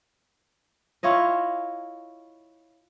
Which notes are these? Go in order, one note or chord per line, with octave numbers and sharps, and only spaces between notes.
E4 F4 C#5 D#5